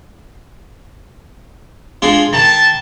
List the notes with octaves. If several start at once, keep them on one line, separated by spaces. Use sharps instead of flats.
G#3 D4 F4
D#3 A5